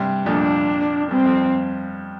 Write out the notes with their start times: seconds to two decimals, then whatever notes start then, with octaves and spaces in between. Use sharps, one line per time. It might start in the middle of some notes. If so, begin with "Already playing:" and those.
Already playing: G2 C3
0.26 F2 A#2 D4
1.11 G2 C4
1.25 F2